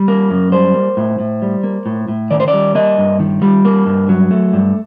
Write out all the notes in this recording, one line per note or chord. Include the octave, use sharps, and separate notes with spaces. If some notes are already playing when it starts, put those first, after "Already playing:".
Already playing: G3
A#3
F#2
G3 C5
A#3
A2
A2
G3
A#3
A2
A2
D#3 D5
C5
D5
G3
A#3 D#5
G2
D#3
G3
A#3
G2
F#3
A3
G2